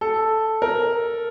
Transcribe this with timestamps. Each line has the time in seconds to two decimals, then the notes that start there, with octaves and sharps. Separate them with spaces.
0.01 A4
0.62 A#4